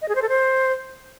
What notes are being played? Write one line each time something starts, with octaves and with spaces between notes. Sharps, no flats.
D#5
G#4
C5
A4
C5